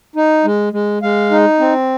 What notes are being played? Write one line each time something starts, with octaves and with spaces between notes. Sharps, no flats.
D#4
G#3
G#3
G#3 F5
D#4
C4